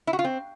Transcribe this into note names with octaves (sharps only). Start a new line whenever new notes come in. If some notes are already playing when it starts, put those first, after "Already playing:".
E4
F#4
F4
C4